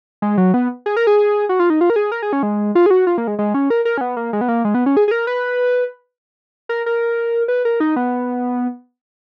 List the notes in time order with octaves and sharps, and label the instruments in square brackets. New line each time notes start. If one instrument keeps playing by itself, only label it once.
[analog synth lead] G#3
F#3
B3
G#4
A#4
G#4
F#4
F4
D#4
F4
A#4
G#4
A#4
G#4
C#4
G#3
F4
G#4
F#4
F4
A#3
G#3
G#3
C#4
A#4
A#4
C#4
B3
A#3
G#3
B3
A#3
G#3
B3
C#4
G#4
G#4
A#4
B4
A#4
A#4
B4
A#4
D#4
B3